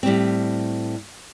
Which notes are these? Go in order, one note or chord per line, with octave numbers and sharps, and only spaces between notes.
A2 G3 C4